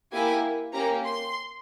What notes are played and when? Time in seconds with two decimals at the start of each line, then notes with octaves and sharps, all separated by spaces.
0.13 A#3 E4 G4 G#5
0.73 A#3 C#4 G4 A#5
1.05 C6